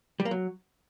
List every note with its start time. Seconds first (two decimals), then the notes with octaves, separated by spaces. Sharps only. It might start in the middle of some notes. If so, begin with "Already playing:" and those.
0.20 G3
0.25 A#3
0.31 F#3